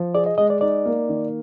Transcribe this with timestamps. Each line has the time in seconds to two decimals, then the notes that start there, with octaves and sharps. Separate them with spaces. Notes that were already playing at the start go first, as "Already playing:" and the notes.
Already playing: F3
0.15 G#4 D5
0.26 D#5
0.38 G#3 D#5
0.50 D5
0.61 D#4 D5
0.85 A#3
1.09 D#3